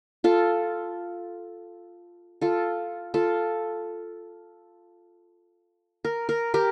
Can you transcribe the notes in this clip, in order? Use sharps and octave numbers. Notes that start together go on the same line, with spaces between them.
F4 A4
F4 A4
F4 A4
A#4
A#4
G4 A#4